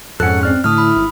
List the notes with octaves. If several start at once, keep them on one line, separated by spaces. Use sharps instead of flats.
F2 G#2 C#4 A4 F#5 F#6
C4 D5 F6
A2 D3 A3 E4 D#6 F6
B5
G#1